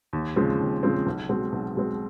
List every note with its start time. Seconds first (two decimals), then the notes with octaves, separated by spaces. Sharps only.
0.13 D#2
0.36 C#3 F3 G#3 C4
0.60 D#2
0.83 C#3 F3 G#3 C4
1.06 B1
1.29 B2 G#3 C4
1.52 B1
1.76 B2 G#3 C4